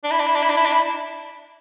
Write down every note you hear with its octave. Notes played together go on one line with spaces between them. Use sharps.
D4
E4
D4
E4
D4
E4
D4
E4
D4
E4